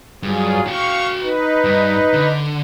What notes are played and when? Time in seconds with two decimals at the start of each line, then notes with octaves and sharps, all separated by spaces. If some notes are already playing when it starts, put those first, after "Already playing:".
0.23 G2 F#3 F4 G#4
0.67 F#4 F5 G5 C#6
1.21 D#4 B4
1.64 G2
2.13 D3